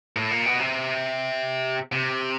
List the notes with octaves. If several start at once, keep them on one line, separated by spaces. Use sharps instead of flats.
A2
A#2
B2
C3
C3